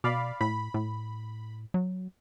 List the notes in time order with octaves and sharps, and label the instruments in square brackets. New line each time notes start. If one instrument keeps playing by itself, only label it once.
[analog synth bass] B2 [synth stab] D5 F5 B5
[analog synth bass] A2 [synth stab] B5
[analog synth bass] A2
F#3